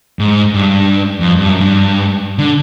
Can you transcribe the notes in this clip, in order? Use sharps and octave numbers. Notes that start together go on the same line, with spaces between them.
G#2
G2
F2
G2
F#2
G2
D3